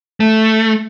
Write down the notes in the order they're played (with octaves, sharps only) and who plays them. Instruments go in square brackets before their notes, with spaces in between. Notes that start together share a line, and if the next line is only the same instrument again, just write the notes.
[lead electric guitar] A3